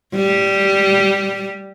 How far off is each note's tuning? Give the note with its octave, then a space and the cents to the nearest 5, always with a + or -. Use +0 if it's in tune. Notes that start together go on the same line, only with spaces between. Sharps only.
G3 -5